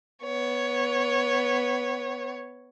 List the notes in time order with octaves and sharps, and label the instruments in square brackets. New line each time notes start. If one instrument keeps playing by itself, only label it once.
[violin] B3 C#5